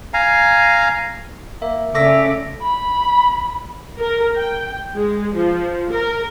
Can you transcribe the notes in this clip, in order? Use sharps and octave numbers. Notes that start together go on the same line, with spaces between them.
F5 G#5 A#5
A#3 E5
C#3 A3 C#4 D5 E5 D6 A#6
B5
A#4
G5
G#3
F3
A#4